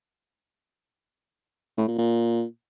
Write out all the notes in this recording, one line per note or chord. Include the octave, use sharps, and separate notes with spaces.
A2
A#2
A#2